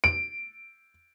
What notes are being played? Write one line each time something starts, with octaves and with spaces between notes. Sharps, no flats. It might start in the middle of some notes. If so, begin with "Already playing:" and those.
D7